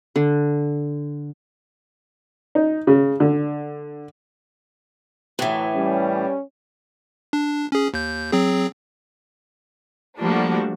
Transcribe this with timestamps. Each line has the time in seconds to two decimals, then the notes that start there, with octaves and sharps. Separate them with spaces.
0.16 D3
2.55 D#4
2.87 C#3
3.20 D3
5.39 D2 A2 E3 F#3
5.75 G3 C#4
7.33 D4
7.72 C#4 G#4
7.94 D#2 G6
8.32 F#3 C4 G#4
10.19 F3 G3 A3 A#3 D4 F#4